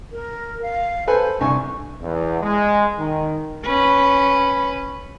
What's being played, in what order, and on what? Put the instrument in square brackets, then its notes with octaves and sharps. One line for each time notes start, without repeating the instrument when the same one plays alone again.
[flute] A#4
F5
[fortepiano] A4 B4 G#5 [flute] C5
[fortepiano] C2 D4 G#5 [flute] C#6
[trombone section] E2
G#3
D#3
[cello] C#4 B4